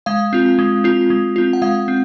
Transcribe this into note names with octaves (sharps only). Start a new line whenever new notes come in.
G#3 F5
C4 F4
G#3
C4 F4
G#3
C4 F4
F#5
G#3 F5
C4